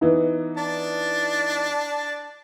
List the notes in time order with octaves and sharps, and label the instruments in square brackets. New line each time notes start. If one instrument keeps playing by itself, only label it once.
[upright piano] E3 B3 D#4
[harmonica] D4 A5